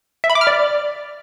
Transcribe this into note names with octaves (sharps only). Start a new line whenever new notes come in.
E5
B5
D6
F6
D5